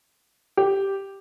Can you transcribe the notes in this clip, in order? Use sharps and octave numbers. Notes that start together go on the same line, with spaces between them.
G4